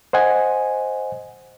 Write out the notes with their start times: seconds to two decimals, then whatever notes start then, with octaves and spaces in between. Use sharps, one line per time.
0.13 C5 D#5 F#5 G#5